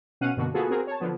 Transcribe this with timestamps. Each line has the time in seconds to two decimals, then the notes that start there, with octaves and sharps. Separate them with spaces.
0.21 B2 C#4 F5 F#5 F#6 D#7
0.37 G2 B2 D3 A#3 F#4
0.54 A#3 B3 F4 F#4 G#4 A4
0.70 C4 F#4 G#4 A#4
0.87 C#5 A5
1.00 D3 F3 B3